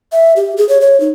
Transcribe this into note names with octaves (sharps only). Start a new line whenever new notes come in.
E5
G4
G#4
C#5
C#5
D#4